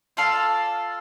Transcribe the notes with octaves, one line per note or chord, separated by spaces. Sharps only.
F4 A4 D5 F5